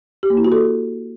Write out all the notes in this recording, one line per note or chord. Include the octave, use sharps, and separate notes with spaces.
G4
A#3
E4
F#4
A4